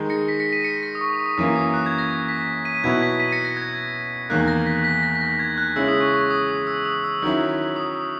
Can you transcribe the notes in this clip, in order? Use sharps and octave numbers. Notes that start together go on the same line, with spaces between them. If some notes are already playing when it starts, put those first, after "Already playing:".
Already playing: D#3 G#3 D#4
A#6 C#7
B6
A#6 C#7
B6 D#7
A#6 C#7
A#6
D#6
C#6
D#6
D#6
F#2 E3 A#3 D#6
D#6
F#6
G#6
A#6
A#6
B6
B6 D#7
B2 F#3 B3 E4 G#6
B6
B6 D#7
A#6 C#7
A#6
G#6
E2 D#3 A#3 F#6
A#6
B6
B6
A#6
B6
A#6
G#6
F#6
C#3 G#3 C#4 E4 E6
D#6
C#6
C#6
D#6
D#6
E6
D#6
E6
D#3 F#3 C#4 E4
D#6
D#6